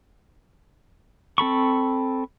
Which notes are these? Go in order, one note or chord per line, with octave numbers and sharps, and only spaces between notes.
C4 A4 B5 C#6